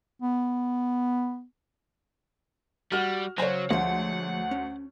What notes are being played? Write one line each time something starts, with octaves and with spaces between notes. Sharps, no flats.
B3
G3 F#4 F6
C#3 F#3 C5 C#5 G#5 A#5
D2 F3 G#3 F#5
C#4